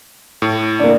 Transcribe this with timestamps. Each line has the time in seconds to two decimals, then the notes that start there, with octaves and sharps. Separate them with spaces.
0.42 A2
0.79 A#3 D4